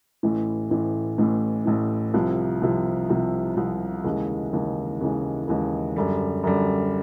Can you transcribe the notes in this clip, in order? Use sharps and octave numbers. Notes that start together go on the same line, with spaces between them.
A1 A2 E3
A1 A2 E3
A1 A2 E3
A1 A2 E3
C2 C3 F3
C2 C3 F3
C2 C3 F3
C2 C3 F3
D#2 C#3 E3 G#3
D#2 C#3 E3 G#3
D#2 C#3 E3 G#3
D#2 C#3 E3 G#3
F#2 D3 G3
F#2 D3 G3